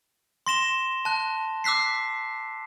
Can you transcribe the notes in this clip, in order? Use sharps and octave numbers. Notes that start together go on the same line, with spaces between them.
C6 A#6 E7 G7
A5 F#6
D6 E6 F#6 B6 C7